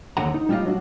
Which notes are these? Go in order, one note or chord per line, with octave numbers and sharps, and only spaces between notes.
D#2 D3 F#5 A#5
D#4
G3 D4 F4 F#4 D#5 F5
F#3 D4 F#4